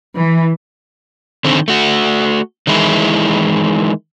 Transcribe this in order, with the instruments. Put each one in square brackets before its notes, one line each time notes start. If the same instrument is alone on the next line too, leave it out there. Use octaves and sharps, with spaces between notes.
[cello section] E3
[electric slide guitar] D3 D#3 C4
A3 F#4
D#3 E3 G#3 E4